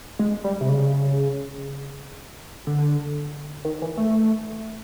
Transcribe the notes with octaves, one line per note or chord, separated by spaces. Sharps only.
G#3
G3
C3
C#3
D3
D#3
E3
A3